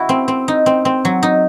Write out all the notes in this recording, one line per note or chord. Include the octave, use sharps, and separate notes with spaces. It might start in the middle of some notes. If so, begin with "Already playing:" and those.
Already playing: E4 F#4
C4
C4
D#4
C4
C4
F#3
D#4